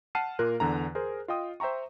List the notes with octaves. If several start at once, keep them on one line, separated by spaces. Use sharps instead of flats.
F#5 A5 F6 C7 D#7
A#2 A#3 F4 A#4 F#6
E2 D3 A#5
G#4 A#4 C5
F4 D#5 G5 D#6
C5 E5 G5 A#5 C#6